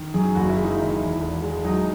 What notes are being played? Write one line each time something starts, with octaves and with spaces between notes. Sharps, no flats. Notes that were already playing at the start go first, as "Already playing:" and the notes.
Already playing: D#3
F#2 G#4
F#1 F#4
E4
G#3
D#4
D#3 E4
E2
E1
G#3
F#3 D#4